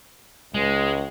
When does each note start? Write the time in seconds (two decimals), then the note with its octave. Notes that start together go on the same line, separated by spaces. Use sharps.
0.54 C#2 G#3